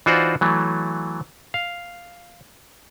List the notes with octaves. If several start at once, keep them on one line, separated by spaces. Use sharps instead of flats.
E3 D#4 F4 F#4 C5 D5
E3 F#3 A3
F5